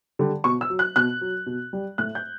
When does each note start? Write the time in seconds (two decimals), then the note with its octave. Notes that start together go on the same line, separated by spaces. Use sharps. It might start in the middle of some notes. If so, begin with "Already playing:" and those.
0.19 D3 G3
0.44 B2 C#6
0.61 E6
0.70 F#3
0.79 F#6
0.96 B2 F#6
1.21 F#3
1.46 B2
1.73 G3
1.98 A2 F#6
2.15 G6